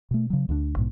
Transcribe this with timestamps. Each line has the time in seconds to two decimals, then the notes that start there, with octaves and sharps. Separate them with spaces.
0.11 B2 A3
0.30 C#3 F#3
0.49 D2 D3 A3 D4
0.76 A#1 G#2 B2